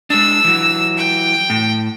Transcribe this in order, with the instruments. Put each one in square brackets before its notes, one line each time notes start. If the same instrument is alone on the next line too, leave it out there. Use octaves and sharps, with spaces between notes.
[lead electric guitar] G#3 D4 [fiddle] E6
[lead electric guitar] E3 F#3
[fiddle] G5
[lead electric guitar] A2